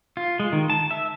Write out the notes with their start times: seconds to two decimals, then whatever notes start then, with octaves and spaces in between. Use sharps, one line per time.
0.17 F4
0.40 G#3
0.53 D#3
0.70 A5
0.91 E5